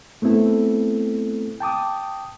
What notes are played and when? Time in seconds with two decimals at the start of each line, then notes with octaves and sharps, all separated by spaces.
0.22 A3 B3 C4 E4 A4
1.60 G5 A5 D6 D#6